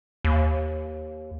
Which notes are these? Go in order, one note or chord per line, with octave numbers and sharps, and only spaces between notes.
D#2